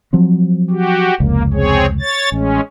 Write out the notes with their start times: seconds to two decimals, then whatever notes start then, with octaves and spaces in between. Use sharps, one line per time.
0.13 F3 F#3 C4
0.71 F#4 G4
1.20 F1 C#2 A#3
1.54 C4 G#4 C#5
2.01 C#5 A6
2.32 A1 G#3 C#4